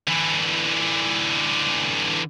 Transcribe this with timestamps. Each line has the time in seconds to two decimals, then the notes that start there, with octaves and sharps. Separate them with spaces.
0.08 D3 E3